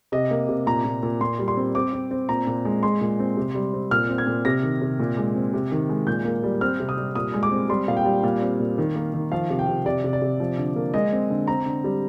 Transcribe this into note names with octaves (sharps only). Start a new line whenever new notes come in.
C3 D#5
A#3
C3
A#2 A#5
A#2
A#2
A#2 C6
G3
C6
C4
C4 D6
C4
C4
A#2 A#5
A#2
G#3
G#3 C6
A#2
C4
C3
G3
C4
A#2 F6
C4
G#6
A#2
C3 A#6
D#3
C3
A#2
G#3
C4
C3
D#3
G#3
A#2 G6
A#3
G3
C4 F6
C3
D#6
G3
A#2 D#6
G#3
D6
C4
G3 C6
A#2 F5
G5
G3
A#2 F5
C4
A#2
D#3
A#3
D#3
F3 F5
C3
G5
C3
C3 D5
C3
D5
C3
F3
D3
A#3
G#3 D#5
C4
D3
C4 A#5
D3
G3